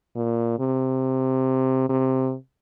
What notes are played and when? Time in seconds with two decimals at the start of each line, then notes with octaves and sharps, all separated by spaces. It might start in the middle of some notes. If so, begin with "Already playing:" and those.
0.16 A#2
0.59 C3
1.89 C3